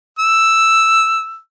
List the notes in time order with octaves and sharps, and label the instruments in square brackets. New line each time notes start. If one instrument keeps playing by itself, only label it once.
[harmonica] E6